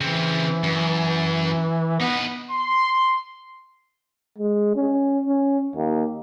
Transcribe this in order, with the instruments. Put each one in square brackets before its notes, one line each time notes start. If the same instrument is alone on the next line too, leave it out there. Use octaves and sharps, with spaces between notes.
[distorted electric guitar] C#3 C4 [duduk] E3
[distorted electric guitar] F#2
[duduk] B3 [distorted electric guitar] D#4 B4
[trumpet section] C6
[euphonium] G#3
C#4
C#4
D#2